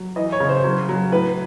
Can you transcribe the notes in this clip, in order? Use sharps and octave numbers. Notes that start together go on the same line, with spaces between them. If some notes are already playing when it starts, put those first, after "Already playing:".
Already playing: F#3
E3 D#5
C#5
C#3
C5
F#3
F#3
A2 B4